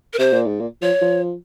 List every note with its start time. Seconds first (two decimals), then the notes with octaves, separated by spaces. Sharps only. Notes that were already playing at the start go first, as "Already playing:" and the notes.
0.13 A#4
0.19 C3 C5
0.33 A#2
0.46 G#2
0.60 A#2
0.82 F3 C#5
1.02 F3